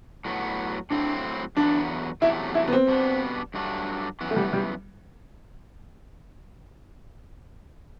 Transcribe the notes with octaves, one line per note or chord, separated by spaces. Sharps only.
A2 F#3 B3
A2 F#3 C4 D4 E4
E2 D3 F#3 B3 D4
E2 C3 F#3 A3 E4
E4
B3
C4
B2 G3 B3 D4
G2 F#3 A3 D4
F#2 E3 B3
A3
G3
G3